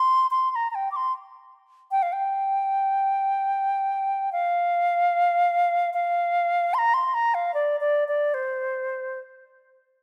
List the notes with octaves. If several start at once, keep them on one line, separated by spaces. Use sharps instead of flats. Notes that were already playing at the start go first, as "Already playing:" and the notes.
Already playing: C6
C6
C6
A#5
A#5
G5
D6
C6
G5
F5
G5
F5
F5
C6
A#5
C6
A#5
F5
D5
D5
D5
C5